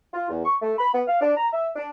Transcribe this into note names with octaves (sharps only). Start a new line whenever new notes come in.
F4
E2
C#6
A3
B5
B3
F5
D4
A#5
E5
D4